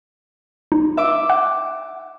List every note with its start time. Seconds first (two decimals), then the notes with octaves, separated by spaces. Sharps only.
0.72 D#4
0.97 E5 D6
1.30 F#5 F#6